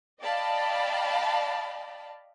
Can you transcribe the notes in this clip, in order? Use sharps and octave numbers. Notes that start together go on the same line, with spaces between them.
D5 D#5 F5 G5 A5 B5